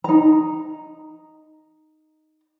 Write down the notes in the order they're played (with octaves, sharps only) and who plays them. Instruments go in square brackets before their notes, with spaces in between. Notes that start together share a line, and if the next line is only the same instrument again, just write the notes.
[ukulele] D#4 A#5